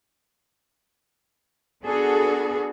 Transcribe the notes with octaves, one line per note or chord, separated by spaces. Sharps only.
B3 D4 F#4 G#4 A4